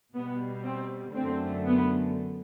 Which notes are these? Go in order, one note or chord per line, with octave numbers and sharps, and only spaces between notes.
B2 G3 B3
C4
F#2 D3 A3 C4
B3